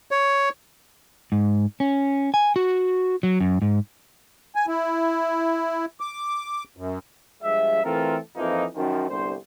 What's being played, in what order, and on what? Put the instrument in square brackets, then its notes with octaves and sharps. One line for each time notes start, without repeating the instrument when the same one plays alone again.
[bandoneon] C#5
[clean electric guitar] G#2
C#4
G#5
F#4
F#3
F#2
G#2
[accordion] G#5
E4
D6
F#2
[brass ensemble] G2 F3 G#3 E5
E3 A3 C4 F4 A4 A#4
F2 E3 F3 A#3 D#4
F#2 D#3 F3
G1 C2 D3 C5